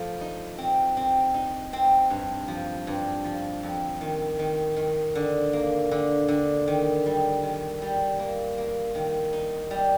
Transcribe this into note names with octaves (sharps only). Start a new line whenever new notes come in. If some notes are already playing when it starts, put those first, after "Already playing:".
Already playing: F3 A3
D#4
C4
C4
D#4
C4
G2
F3
G2
F3
F2
D#3
D#3
D#3
D3
A#3
D3
D3
D#3
G3
D#3
G3
A#3
A#3
D#3
D#4
G3